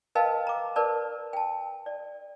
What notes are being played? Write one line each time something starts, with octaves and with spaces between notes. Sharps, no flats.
A#4 B4 D#5 F5 G5 A5
A#5 D6
A#4 B4 D5 A5
G5 A5
D5